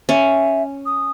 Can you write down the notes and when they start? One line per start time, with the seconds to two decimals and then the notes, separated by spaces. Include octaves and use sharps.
0.09 C#4 E5
0.86 D#6